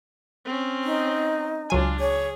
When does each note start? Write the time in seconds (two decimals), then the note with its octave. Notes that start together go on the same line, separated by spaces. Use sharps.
0.45 C4 C#4
0.84 D#4
1.70 C#2 F#3 D4 F4 G#5
2.00 G#4 C#5